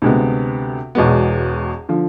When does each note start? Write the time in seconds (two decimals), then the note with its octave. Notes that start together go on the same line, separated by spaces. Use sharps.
0.02 D2 C3 G#3 B3
0.95 E1 E2 B2 G#3 B3
1.89 D3 F3